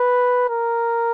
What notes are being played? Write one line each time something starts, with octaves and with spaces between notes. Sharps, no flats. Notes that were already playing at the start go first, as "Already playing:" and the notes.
Already playing: B4
A#4